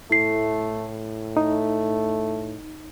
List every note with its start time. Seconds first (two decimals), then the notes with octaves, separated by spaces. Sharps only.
0.11 A2 A3 E4 C7
1.37 A3 D#4